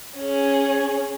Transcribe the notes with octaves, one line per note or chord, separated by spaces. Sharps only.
C#4 G#4